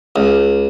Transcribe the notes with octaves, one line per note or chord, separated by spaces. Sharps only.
C#2